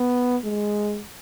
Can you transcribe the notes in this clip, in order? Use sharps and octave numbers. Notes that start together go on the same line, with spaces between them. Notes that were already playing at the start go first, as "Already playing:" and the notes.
Already playing: B3
G#3